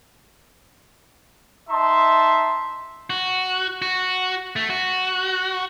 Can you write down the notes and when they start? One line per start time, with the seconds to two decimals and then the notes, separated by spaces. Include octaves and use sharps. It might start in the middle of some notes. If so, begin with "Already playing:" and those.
1.70 D#4 E5 A5 C6
3.10 F#4
3.82 F#4
4.56 A3
4.70 F#4